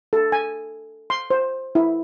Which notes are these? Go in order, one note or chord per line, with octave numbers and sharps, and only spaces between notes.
A4
G#5
C6
C5
E4